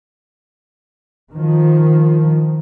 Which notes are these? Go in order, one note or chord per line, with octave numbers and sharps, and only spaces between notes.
D#3 F3